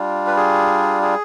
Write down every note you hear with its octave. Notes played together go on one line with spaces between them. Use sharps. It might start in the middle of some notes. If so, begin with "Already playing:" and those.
Already playing: G3 D4 F4
B4
G#4
G#4